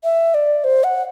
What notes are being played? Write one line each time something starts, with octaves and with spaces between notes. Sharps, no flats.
E5
D5
C5
F#5